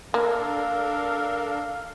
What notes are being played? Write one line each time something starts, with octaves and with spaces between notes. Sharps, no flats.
A#3 D4 A4 A#4 F5